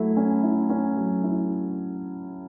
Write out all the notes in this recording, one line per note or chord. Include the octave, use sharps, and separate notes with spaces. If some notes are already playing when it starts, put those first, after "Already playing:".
Already playing: F#3 A3 E4
C#4
E4
C#4
F#3
E4